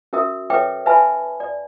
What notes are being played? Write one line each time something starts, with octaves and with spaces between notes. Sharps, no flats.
C#4 F#4 A#4 E5 D#6
A4 B4 C#5 E5 G5 D6
B4 E5 F5 G#5 A5 B5
D5